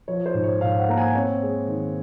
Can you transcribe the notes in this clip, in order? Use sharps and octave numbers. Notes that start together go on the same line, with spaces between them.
F3 C#5
C5
G#2
C#5
G#2 F5
F#5
A#3 A#5
G#5
C4 C#5
G#3
D#3